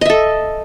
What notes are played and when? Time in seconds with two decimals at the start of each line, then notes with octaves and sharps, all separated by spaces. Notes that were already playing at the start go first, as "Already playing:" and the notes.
0.01 D#5
0.05 E5
0.10 A4